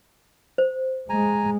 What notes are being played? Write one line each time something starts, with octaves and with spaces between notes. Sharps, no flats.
C5
G#3 G#5 A#5